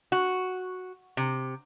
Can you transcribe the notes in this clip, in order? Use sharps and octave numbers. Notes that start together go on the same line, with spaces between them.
F#4
C3